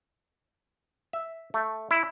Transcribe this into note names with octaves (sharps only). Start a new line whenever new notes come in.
E5
A3
E4